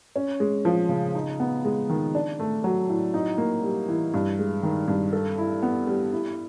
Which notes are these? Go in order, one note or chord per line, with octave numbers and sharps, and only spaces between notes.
C#4
G#3
F3
C#3
D#4
B3
G#3
D#3
D4
A3
F#3
A2
D#4
A#3
G3
E3
G2
G#3
D#3
G2
A4
E4
B3
G3
E4